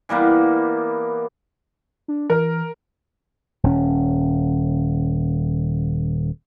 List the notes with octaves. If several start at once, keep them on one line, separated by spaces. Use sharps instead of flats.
E3 G3 A#3 B3
D4
E3 A#4
D#1 C#4